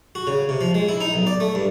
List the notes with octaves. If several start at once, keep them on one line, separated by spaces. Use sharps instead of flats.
F#4
C#3
C3
F3
G#3
E4
D#4
B1
D5
A3
G2